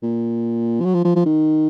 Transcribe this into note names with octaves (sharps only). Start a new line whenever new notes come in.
A#2
F3
F#3
F3
F3
F3
D#3